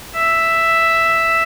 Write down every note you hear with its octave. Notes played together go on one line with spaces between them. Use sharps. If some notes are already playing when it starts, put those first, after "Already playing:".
E5